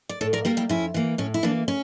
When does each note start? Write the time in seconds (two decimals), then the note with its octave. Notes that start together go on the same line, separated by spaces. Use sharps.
0.09 D5
0.21 A2 A4 C#5
0.33 A#4 D5
0.45 G3 A#3 G4 A#4
0.57 E4 G4
0.69 F2 C#4 E4
0.94 E3 A#3
1.18 A2 C#4
1.34 E4
1.43 E3 A#3 D4
1.68 C#4